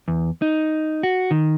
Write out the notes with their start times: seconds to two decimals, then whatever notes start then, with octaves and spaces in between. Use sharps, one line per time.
0.08 E2
0.42 D#4
1.03 F#4
1.31 D#3